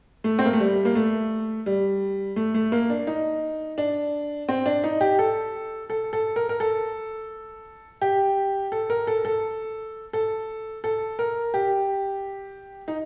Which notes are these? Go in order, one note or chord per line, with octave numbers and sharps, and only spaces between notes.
A3
C4
A#3
A3
G3
A#3
A3
G3
A3
A3
A#3
D4
D#4
D4
C4
D4
D#4
G4
A4
A4
A4
A#4
A#4
A4
G4
A4
A#4
A4
A4
A4
A4
A#4
G4
D#4